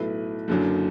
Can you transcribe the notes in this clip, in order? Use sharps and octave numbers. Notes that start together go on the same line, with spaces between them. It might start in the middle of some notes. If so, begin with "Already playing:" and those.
Already playing: B1 A2 A3 E4 B4
F#1 F#2 D3 F#3 D4